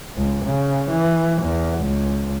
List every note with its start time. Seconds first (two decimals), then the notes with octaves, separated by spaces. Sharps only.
0.16 C#2
0.45 C#3
0.89 E3
1.42 E2
1.80 C#2